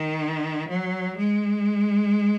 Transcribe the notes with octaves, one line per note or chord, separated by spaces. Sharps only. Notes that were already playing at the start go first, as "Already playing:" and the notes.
Already playing: D#3
F#3
G#3